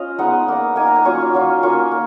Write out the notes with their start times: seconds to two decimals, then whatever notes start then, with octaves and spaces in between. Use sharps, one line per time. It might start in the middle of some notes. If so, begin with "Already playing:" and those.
Already playing: C#4 F4 D#5 F5
0.19 G#3 B3 D#4 F#5
0.48 A#3 D#4
0.76 A#3 D#4 G#5
0.87 A#5
0.96 G#5
1.05 F#3 C#4 F4 C#6
1.34 F#3 C#4 F4
1.63 A#3 C#4 F4 C#6
1.91 A#3